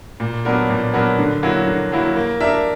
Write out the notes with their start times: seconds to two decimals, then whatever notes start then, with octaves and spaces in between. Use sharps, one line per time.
0.20 A#2
0.45 F#3 B3 D4 A#4
0.70 A#2
0.93 F#3 B3 D4 A#4
1.19 D3
1.43 F#3 A#3 E4
1.67 D3
1.92 F#3 A#3 E4
2.16 A#3
2.40 D4 A#4 E5